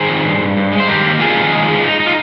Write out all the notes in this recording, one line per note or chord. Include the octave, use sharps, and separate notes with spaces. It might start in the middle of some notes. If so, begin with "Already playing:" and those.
Already playing: D#3 G#4 C5
F2
G2
G2
G2
G#3
C5
D#3 G4 A#4
A#3
F2 F4 G#4
D#3
G#3
G#3
D#4
D#4
F4